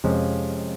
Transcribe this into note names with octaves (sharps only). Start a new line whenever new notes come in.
F2 C3 F3 G#3 C#4